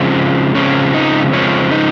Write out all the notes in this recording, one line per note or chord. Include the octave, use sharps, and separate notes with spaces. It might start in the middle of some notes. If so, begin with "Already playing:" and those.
Already playing: C#3 F3 G#3 C4
C#3 F3 G#3 C4 C#4
D#4
C#3 F3 G#3 C4 C#4
D#4